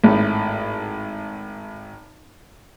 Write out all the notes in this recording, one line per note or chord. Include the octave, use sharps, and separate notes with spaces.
G#1 A2